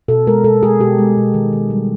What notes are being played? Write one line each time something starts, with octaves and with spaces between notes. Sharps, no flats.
B2 A4
G#3 A#4
B2 A4
G#3 G#4
B2 G4
G#3
B2
D#3
D#3
G3